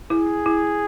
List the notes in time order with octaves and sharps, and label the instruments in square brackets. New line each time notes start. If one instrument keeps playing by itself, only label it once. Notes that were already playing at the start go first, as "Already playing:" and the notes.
[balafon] E4 [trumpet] G#4
[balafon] E4